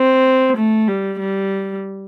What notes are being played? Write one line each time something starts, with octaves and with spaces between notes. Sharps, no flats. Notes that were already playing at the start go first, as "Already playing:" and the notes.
Already playing: C4
A3
G3
G3